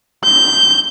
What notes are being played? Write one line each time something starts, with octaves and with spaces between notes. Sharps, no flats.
G6